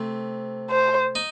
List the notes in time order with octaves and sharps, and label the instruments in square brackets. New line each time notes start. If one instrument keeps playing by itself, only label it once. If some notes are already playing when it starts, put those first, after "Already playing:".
Already playing: [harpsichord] C3 A3 C4
[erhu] C5
[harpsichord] D#4